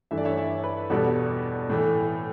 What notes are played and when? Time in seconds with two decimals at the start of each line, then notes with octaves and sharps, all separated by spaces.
0.11 G2 E3 A3 E5
0.18 D5
0.25 C#5 E5
0.37 C#5 E5
0.63 B4
0.90 E2 B2 G3 B3 A4
1.69 A2 E3 A3